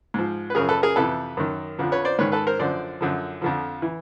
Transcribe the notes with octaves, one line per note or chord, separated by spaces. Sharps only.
G#2 F3
B4
F#2 C#3 F3 G#4 A#4
A4 B4
G#4 A#4
F2 C3 E3 A4 B4
F#2 D#3
F2 D3 F3
B4 C#5
C5 D5
G#2 D#3 B4 C#5
A4 B4
A#4 C5
F#2 D3 F3 C5 D5
F#2 D3 F3
F2 D3 F3
E3